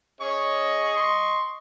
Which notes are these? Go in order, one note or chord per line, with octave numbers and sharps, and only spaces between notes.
C#4 G#4 D#5 C#6
C6 C#6